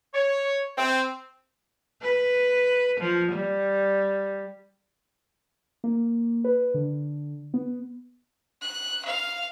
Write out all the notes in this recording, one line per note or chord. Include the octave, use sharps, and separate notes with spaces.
C#5
C4
B4
F3
G3
A#3
B4
D3
B3
F#6
F5